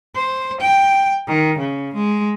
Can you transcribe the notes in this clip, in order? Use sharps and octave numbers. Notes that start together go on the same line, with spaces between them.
C5
G5
D#3
C#3
G#3